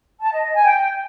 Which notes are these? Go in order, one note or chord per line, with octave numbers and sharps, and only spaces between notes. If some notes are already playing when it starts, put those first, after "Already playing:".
A5
D#5
D#5
G#5
G5